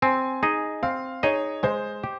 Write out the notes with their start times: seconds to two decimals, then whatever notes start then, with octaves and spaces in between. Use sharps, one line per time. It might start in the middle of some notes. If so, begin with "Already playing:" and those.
0.02 C4 G#5
0.43 D#4 G#4 D#5
0.83 C4 F5
1.23 D#4 G#4 C#5 D#5
1.63 G#3 C5
2.04 G4